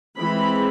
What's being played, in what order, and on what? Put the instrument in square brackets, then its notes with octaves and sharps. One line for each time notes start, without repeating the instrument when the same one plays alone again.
[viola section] E3 G#3 C4 B5